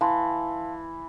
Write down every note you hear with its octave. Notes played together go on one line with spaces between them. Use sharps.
E3 F5 A5 C6